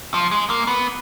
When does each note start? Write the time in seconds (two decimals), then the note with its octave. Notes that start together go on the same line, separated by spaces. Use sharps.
0.14 F3
0.31 G#3
0.50 A#3
0.67 B3